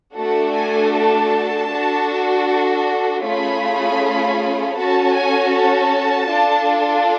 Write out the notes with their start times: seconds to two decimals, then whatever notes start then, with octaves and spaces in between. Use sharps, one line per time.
0.15 A3 D4 F#4 A4 F#5
0.54 G#5
0.93 A5
1.70 D4 F#4 A4
3.22 A3 C#4 F4 G#4 B5
4.76 C#4 F#4 A4 A5
5.15 G#5
5.53 A5
6.29 D4 F4 A4